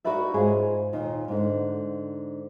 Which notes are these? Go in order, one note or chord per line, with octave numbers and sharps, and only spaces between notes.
D#4 F#4 A#4 B4 D5 E5
G#2 F4 G#4 C#5 G#5
D#2 A#2 D#4
G#2 D3